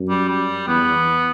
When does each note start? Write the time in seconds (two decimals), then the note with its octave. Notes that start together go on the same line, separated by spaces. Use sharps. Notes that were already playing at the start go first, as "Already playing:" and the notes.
Already playing: F#2
0.09 G3
0.29 G3
0.67 E2 B3